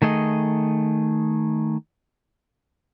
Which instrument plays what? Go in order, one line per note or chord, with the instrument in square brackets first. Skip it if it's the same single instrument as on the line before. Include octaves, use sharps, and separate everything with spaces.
[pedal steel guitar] D#3 A3 G#4 D#5